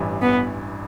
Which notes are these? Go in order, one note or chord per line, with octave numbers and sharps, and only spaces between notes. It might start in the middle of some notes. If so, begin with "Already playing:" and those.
Already playing: A1 G2 E3
B3